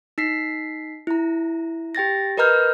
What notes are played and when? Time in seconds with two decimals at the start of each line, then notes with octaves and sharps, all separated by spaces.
0.18 D#4 B6 C7
1.07 E4 A#5
1.95 G4 G5 A6 A#6
2.37 A#4 B4 D#5 A#5 F6 G6